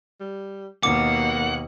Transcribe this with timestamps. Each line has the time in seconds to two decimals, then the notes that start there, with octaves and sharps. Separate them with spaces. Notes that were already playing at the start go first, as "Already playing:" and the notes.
0.20 G3
0.83 D#2 B2 A#3 F#5 D6